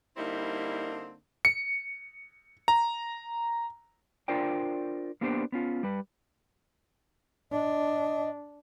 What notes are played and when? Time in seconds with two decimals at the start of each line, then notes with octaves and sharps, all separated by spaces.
0.17 D3 G3 A#3 C4 D#4 E4
1.45 C#7
2.68 A#5
4.28 D4 F4 A#4 C5 D5 G5
5.21 A#3 B3 D4 G4 C5
5.52 B3 C#4 F4
5.83 G3 B4
7.52 D4 D#5